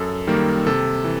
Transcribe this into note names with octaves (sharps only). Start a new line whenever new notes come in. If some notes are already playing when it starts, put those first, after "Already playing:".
Already playing: F#2 A4
D#3 G3 A#3
C3 A4
E3